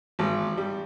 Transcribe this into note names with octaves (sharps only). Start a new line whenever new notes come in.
G#1
G3